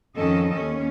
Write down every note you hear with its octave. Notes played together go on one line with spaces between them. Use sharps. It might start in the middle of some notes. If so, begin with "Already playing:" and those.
F2 D#3 C#4 A4 D#5
D#2 C#4